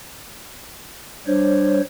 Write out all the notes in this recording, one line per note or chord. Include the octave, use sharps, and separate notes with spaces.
G3 D4 C5 C#5